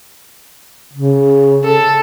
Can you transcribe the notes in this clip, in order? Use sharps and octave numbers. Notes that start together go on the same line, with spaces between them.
C#3
A4